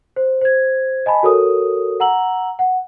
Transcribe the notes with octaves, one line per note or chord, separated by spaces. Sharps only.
C5
C5 G#6
D#5 G#5 A5 B5
F#4 A4 A#4 C#5 D#6
F#5 A#5 E6 F#7
F#5